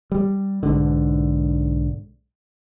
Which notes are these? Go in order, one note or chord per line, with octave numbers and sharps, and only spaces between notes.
G3
B1 G#2 D3